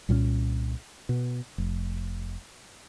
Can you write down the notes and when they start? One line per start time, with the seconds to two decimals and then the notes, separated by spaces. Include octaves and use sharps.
0.09 C2 A#2 E3 C#4
1.09 B2
1.58 F1